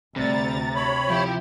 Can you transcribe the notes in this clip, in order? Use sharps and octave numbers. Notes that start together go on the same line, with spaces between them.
D2 C3 G3 A#5 A6
C#5 B5
F3 E4 G4